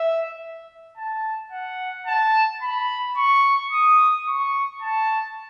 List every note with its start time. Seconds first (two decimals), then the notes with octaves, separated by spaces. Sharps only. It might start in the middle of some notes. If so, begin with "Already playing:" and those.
Already playing: E5
0.97 A5
1.52 F#5
2.07 A5
2.62 B5
3.17 C#6
3.72 D#6
4.27 C#6
4.82 A5